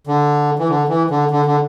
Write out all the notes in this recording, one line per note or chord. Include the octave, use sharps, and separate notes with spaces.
D3
E3
D3
E3
D3
D3
D3